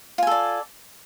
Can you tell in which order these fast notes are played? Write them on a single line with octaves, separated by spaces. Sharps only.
F4 G#5 A4 D5